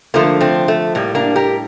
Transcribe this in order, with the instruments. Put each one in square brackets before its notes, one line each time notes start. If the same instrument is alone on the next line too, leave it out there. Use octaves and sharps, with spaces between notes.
[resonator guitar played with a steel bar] D3 F3 A3 A#3
A3 C4
A3
A2 G3 A#3
A#3 D4
G4 A#4